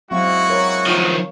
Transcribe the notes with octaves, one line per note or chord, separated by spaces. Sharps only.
F#3 G#3 C4 E4 F#4 F5 C#6
A#4 C#5
D#3 F3